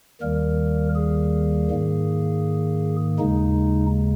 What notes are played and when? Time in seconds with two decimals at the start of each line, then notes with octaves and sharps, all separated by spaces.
0.21 D#2 D#3 G3 A#3 A#4
0.95 G#4
1.70 G#2 D#3 A#3
3.19 D#2 C#3 G#3 D#4